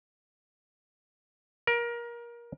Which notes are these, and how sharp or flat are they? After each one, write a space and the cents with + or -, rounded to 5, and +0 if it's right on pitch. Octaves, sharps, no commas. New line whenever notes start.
A#4 +25